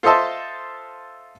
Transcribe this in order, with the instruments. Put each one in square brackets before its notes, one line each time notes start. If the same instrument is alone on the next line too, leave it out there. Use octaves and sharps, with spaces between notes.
[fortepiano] F4 A4 C5 D#5 E5 A5